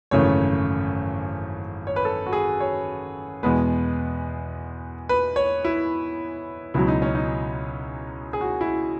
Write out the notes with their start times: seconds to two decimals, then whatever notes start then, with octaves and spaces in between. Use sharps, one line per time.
0.11 G#1 F#2 C#3 E3 A3 C#5
1.87 C#5
1.96 B4
2.05 A4
2.26 F#4
2.33 G#4
2.61 C#5
3.43 E2 B2 G#3 B3 B4
5.09 B4
5.36 C#5
5.65 E4
6.74 C#2 B2 F#3 E4
6.88 D#4
7.02 C#4
7.15 D#4
8.33 G#4
8.41 F#4
8.61 E4